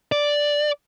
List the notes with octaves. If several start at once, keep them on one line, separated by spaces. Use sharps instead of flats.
D5